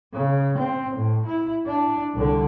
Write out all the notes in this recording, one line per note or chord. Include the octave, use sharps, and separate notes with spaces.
C#3
C4
A2
E4
D4
C2 D3